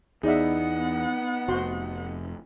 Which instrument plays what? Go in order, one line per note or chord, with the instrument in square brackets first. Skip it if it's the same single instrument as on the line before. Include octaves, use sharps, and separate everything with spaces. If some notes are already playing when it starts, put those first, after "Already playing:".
[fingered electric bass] E2 [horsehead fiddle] B3 F#5 [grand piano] D#4 [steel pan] G#4 D5 E5
[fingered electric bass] F1 [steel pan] F#4 C5 C6